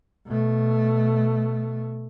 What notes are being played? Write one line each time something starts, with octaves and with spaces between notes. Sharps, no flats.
B2 A3